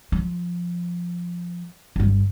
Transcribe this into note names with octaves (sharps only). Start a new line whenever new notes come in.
F3
G1 G2